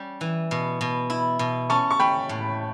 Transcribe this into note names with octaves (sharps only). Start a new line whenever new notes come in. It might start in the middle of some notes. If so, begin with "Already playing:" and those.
Already playing: G3 C#4
E3
B2
B2
E4
B2
C#4 A5 C#6
C#6
C#4 G5 B5
A2